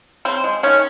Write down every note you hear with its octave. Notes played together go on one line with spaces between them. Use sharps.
C#3 C4
G#3
D#3 C#4